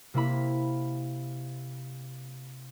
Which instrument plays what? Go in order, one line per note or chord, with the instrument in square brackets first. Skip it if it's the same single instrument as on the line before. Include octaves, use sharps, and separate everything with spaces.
[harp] C3 A#3 E4 B5